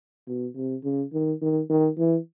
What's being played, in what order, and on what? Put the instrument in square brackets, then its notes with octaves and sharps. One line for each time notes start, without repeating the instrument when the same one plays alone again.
[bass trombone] B2
C3
C#3
D#3
D#3
D#3
E3